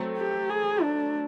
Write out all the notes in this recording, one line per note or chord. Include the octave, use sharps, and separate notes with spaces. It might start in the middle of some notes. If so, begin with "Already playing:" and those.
Already playing: F#3 A3 C4
G4
G#4
D4